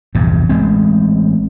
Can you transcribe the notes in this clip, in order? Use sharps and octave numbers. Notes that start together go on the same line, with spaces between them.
A#1 E2 G2 C3
A1 G#3 C4